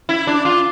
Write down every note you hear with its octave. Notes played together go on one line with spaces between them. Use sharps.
E4
D4
F4